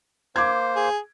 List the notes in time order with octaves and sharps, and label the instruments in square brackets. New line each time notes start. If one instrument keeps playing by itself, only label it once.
[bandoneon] A#3 C5 [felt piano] D6 G#6
[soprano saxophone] G#4